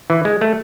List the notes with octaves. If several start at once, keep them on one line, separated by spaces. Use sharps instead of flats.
E3
G#3
A3